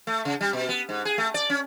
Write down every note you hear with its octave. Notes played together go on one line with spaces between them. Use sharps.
A3
C#3
G3
B2
B3
G#2
G#4
A3
D5
C#4